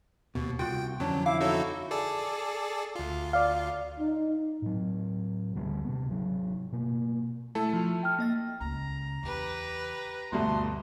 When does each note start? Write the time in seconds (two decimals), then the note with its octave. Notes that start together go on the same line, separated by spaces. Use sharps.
0.35 D#2 B2
0.59 C2 F4 F#4 G5
1.00 F2 D3 E3 F#3 C#4 A5
1.26 E4 F5 D6
1.40 D#4 F#4 A4 C#5
1.91 G#4 A4 D5
2.96 D2 F4
3.33 D5 F5
3.99 D#4
4.62 A2 F#3
5.55 D2 D3 G3 B3
5.85 C3 B3
6.09 G#1 F#3
6.72 B2 A#3
7.55 A3 E4 A4 E6
7.73 F3 F4
8.03 G5 F6
8.19 A#3 D#5 A6
8.61 C#2 C#3 A#5
9.23 E2 G4 B4
10.32 D2 G2 B2 A3 E4 C6